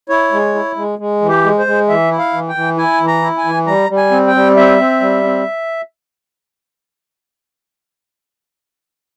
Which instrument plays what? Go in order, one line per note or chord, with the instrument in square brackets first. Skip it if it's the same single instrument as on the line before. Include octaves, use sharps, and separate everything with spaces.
[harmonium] E4 C#5
G#3
E4
G#3
G#3
E3
G4
G#3
C5
G#3
E3 E5
E4
F5
E3
G5
E3
E4 G#5
E3
A#5
E4
G#5
E3
G3 A#5
G3
G#5
C4
G5
G3
C4 E5
C4
G3
C4